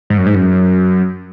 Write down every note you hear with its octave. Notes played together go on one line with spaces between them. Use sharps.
G#2
F#2
G#2
F#2